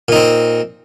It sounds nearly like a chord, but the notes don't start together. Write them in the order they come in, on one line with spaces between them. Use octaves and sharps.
A#2 D#4 C4